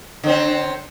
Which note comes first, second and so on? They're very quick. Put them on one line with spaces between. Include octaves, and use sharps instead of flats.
D3 C4 C#4